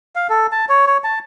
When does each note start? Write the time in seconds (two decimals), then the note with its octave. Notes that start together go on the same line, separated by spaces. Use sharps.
0.16 F5
0.30 A4
0.52 A5
0.69 C#5
0.87 C#5
1.04 A5